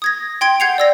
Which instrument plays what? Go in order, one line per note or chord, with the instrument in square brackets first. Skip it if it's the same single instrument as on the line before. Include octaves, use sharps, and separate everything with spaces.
[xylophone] D#6 G#6 A#6
G5 C6 G#6 D7
F#5 G6 G#6 C7 C#7 F7
D5 E6 A#6